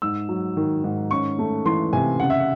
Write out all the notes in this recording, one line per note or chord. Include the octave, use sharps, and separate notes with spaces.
G#2 E6
F#3
D#3
G#2
C#4 C#6
A3
E3 C6
C3 G#5
C#3 F#5
E5
F#5